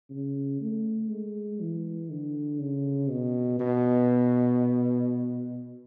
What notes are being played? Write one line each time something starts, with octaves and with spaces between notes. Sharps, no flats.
C#3
A3
G#3
E3
D3
C#3
B2
B2